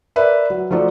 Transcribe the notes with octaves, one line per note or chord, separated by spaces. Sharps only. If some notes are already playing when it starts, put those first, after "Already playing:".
A#4 B4 D5 E5
F#3
F3 A3 D#4 F#4 A4 D5